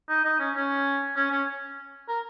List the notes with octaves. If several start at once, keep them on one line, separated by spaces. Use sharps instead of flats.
D#4
D#4
C#4
C#4
C#4
C#4
A#4